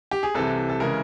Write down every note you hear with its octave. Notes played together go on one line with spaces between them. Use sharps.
G4
G#4
C2 C3 E3 A4
A4
C#3 E3 G#3 A#4